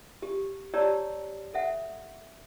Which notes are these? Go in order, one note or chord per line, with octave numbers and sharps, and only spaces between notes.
G4
G4 C#5 D5 A5 A#5 E6
A4 E5 F#5